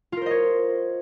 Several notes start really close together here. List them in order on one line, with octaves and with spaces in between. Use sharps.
F4 A#4 C5 D#5 C#5